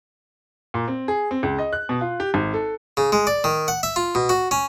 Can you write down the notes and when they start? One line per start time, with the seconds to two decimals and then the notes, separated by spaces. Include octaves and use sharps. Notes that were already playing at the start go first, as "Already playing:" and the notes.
0.74 A#2
0.88 C4
1.08 G#4
1.31 C4
1.43 C#2
1.59 D#5
1.73 F#6
1.89 B2
2.01 F4
2.20 G4
2.34 G#1
2.54 A4
2.97 C#3
3.12 G#3
3.27 D5
3.44 D#3
3.68 F#5
3.83 E5
3.96 F4
4.15 B2
4.29 F#4
4.51 C#4